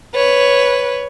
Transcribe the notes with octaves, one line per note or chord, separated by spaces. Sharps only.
B4 C#5